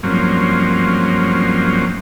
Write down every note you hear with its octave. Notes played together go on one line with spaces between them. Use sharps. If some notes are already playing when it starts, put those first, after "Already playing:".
G2 F3 F#3 A#3 C4 C#4